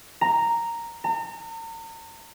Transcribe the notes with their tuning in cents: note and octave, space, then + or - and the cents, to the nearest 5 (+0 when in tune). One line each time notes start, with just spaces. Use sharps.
A#5 -5
A#5 -40